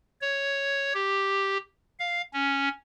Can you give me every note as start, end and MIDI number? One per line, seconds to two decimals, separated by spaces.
0.21 0.93 73
0.95 1.58 67
2.00 2.22 77
2.34 2.69 61